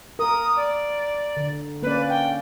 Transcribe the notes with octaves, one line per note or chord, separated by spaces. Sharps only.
A#4 D#6
D5
D3
A#3 C#4 B4 D5
G5